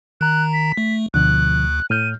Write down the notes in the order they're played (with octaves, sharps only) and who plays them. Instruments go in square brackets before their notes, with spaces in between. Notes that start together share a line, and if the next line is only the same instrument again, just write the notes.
[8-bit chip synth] D#3 A#5 [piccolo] F#6
[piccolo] B6
[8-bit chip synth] A3
[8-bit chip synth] D2 [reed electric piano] B2 D3 F3 [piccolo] F#6
[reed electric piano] A2 F6 G6 [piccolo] D#7